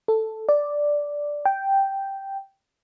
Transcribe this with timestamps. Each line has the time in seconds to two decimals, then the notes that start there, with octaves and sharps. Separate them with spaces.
0.08 A4
0.49 D5
1.45 G5